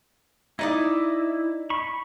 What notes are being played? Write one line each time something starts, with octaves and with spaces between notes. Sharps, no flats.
D#4 E4 D5 D#6
B5 C#6